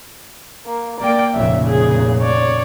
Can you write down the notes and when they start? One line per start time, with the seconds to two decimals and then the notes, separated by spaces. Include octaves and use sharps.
0.66 A#3
1.01 A#3 D5 G5
1.34 F1 A#2 C#3 E5
1.69 G#4
2.21 C#5 D5